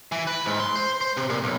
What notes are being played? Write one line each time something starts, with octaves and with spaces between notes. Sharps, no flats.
E3
B4
G#2
C6
C5
C5
C3
A#2
B1